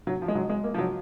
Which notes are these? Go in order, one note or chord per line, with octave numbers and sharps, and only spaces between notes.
F#3
F3
G#3
F#3
G#3
A#3
F3
F#3